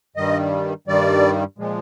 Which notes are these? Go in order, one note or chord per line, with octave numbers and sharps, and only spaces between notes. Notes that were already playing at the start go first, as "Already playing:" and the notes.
G2 D#3 G3 D#5
G2 D#3 G3 D5
A#2 F3 G#3